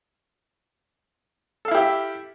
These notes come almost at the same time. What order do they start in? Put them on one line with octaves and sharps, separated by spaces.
A4 F5 E4 G4 E5